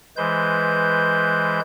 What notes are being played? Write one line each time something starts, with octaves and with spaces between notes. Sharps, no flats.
E3 G#3 B4 C5 G6